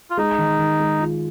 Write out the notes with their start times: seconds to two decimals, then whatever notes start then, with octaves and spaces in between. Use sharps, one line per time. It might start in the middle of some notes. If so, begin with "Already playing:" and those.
0.10 F4
0.17 G#3 D#4
0.38 D#3
0.59 D#3
0.80 G#3
1.00 F4